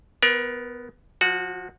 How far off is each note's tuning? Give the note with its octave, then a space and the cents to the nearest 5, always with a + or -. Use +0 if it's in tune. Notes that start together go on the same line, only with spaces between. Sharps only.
B3 +10 A#4 +35
F3 +25 F#4 -10